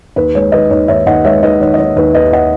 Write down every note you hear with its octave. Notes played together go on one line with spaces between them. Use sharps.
D#2 B4
G#3 C#5
D#3 B4 D#5
D#2 C#5
D#2 C#5 E5
D#2 D#5 F#5
G#3 C#5 E5
D#3 B4 D#5
D#3 C#5
D#5
D#3 C#5
D#2 B4
D#2 B4 D#5
D#3 D#5 F#5